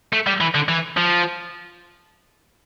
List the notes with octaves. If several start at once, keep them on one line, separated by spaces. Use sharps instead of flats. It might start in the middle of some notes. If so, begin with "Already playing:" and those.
A3
G3
E3
D3
E3
F3